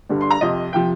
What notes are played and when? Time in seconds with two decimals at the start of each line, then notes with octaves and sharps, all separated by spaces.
0.09 G2 D3 G3
0.21 C6
0.30 A#5
0.41 F2 C3 F3 D#5
0.73 C3 F3 G5